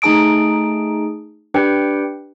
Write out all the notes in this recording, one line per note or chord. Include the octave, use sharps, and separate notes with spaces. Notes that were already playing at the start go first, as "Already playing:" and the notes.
A3 D#4 G#4 A5 D#6 D7
D4 G4 B4 G5 C#7